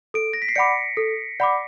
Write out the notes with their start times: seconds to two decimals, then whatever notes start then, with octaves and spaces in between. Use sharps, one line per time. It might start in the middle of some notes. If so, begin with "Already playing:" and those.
0.14 A4 D7
0.33 A#6
0.42 B6
0.49 C7
0.55 D5 F#5 B5 D6 C#7
0.97 A4
1.40 D5 F#5 B5 D6